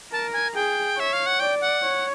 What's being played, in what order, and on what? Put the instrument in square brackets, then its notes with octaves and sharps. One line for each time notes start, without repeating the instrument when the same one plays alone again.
[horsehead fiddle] A#4 [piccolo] A5
[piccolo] G#5
[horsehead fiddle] G#4 [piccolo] G5
[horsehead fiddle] C#5 [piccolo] E5
[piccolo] F5
F#5
[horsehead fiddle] D5 [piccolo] G5
[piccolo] F#5
[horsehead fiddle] C#5